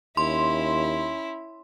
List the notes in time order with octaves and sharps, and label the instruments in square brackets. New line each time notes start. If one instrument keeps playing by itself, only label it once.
[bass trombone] D#2 [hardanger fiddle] C#4 E4 [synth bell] C6